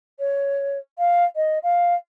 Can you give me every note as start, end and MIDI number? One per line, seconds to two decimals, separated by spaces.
0.20 0.78 73
0.99 1.24 77
1.36 1.59 75
1.63 1.94 77